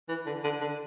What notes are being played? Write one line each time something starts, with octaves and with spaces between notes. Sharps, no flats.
E3
D3
D3
D3